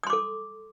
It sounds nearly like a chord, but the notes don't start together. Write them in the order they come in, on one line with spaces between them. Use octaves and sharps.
D#6 C6 D6 A4